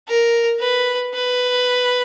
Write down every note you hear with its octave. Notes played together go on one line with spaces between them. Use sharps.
A#4
B4
B4